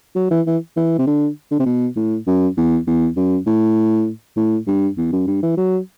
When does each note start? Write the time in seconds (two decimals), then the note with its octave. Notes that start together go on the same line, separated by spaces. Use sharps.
0.16 F#3
0.31 E3
0.47 E3
0.77 E3
0.99 C3
1.07 D3
1.51 D3
1.60 C3
1.66 B2
1.96 A2
2.27 F#2
2.57 E2
2.87 E2
3.16 F#2
3.46 A2
4.36 A2
4.67 G2
4.97 E2
5.12 F#2
5.27 G2
5.43 E3
5.57 F#3